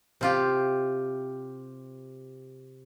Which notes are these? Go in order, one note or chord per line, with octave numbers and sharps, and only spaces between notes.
C3 F4 G4